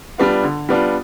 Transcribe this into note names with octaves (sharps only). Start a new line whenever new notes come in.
G3 B3 D4 F4
D3
G3 B3 D4 F4